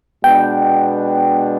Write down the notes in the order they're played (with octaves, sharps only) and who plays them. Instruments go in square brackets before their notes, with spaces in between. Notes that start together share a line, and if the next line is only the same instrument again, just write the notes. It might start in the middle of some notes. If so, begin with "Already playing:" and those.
[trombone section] B2 G#3 B3 D4 [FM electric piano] G5